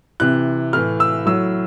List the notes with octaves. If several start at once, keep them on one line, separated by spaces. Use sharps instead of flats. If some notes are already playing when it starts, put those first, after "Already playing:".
C3 E3 F#6
A2 E3 F6
E6
A2 F#3 E6